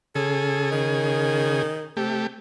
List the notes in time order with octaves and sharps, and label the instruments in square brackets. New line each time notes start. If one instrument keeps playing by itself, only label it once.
[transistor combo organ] C#3 G#4 [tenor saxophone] A4
[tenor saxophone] D#3
[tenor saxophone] C3 [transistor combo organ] A3 G4